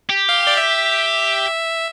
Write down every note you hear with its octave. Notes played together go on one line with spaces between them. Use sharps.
G4
F5
D5
E5